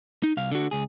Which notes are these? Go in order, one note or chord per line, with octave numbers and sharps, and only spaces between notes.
D#4
C2 F5
D3 F#4
C#2 G#4